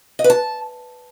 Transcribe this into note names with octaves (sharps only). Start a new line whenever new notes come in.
D#5
B4
A5